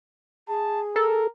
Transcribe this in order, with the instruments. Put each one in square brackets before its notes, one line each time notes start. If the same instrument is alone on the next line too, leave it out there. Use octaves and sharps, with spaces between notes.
[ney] G#4 [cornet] A5
[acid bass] A4 [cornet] A#4